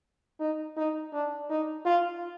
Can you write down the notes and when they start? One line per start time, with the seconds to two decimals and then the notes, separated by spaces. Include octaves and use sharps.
0.40 D#4
0.77 D#4
1.13 D4
1.50 D#4
1.85 F4